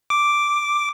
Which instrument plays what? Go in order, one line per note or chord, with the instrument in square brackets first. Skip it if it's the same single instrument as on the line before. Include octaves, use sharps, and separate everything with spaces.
[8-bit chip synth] D6